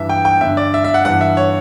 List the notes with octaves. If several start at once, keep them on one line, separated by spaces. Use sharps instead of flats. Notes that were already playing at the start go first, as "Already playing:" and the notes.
Already playing: G2 E3 E5
G5
G5
G2 D3 E5
D5
E5
E5
F#5
G2 E3 F#5
E5
C#5